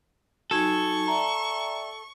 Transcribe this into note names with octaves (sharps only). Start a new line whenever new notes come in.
F#3 D#4 F#4 A4 G#5 C#6 G#6
D5 E5 G5 A#5